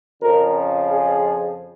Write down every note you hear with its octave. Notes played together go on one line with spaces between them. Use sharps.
F2 C#3 F3 A#4
G#4